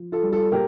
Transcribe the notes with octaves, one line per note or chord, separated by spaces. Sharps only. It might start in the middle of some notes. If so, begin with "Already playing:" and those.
Already playing: F3
F4 A4
G3
F4 A4
A#2 G4 A#4